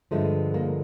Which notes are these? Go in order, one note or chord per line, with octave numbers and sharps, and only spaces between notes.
G2 D3 F3 G#3 A3
A#3